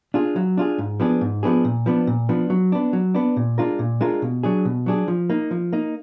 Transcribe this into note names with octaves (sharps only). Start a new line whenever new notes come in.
D4 F4 G#4
F#3
D4 F4 G#4
G#2
F3 B3 D4 G#4
G#2
F3 B3 D4 G#4
A#2
F3 B3 D4
A#2
F3 B3 D4
F#3
B3 D4
F#3
B3 D4
A#2
G#3 D4 F4 A#4
A#2
G#3 D4 F4 A#4
B2
F#3 D4 G#4
B2
F#3 D4 G#4
F3
A#3 D#4
F3
A#3 D#4